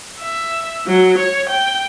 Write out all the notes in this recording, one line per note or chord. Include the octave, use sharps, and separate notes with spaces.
E5
F#3
C#5
G5